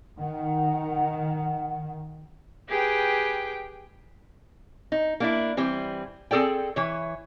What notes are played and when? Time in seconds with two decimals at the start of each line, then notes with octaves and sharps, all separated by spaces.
0.19 D#3 F#5
2.67 G4 G#4 B4 G5
4.92 D#4
5.20 A#3 D4 E4
5.57 E3 G3 C4
6.31 C4 G#4 A4 D5 G5
6.76 E3 C#5